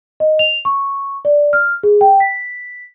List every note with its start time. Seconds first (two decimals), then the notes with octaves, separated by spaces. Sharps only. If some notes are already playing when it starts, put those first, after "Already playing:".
0.20 D#5
0.39 F7
0.65 C#6
1.25 D5
1.53 F6
1.83 G#4
2.01 G5
2.20 B6